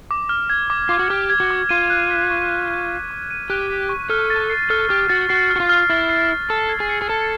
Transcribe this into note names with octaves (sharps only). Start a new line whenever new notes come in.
D6
F6
G#6
D6
F4 D6
F#4
G4 F6
G#6
F#4
D6
F4 D#7
F#6
B6
C#6
D#7
F#6
B6
C#6
D#7
G4 F#6
B6
C#6
A4 F6
A6
C7
A4 F6
G4 F6
F#4 A6
F#4 C7
F6
F#4
F4
F6
E4 A6
C7
F6
A4 E6
G#6
G#4
C#7
G#4
A4 E6